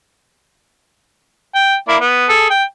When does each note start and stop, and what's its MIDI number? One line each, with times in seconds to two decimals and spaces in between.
1.55 1.76 79
1.88 1.97 58
1.88 1.97 64
1.88 1.97 74
2.01 2.27 59
2.29 2.49 68
2.29 2.49 69
2.50 2.64 79